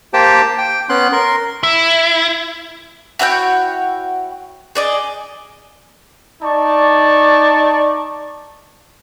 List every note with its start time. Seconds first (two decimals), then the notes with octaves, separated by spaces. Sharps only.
0.14 A#3 G4 C5 G5 A5
0.58 G5
0.89 B3 C#4 C6 F#6
1.12 A#4 C6
1.63 E4
3.19 E4 F#4 C#5 G5
4.75 G#4 D5 D#5
6.42 D#4 D5 A5 C#6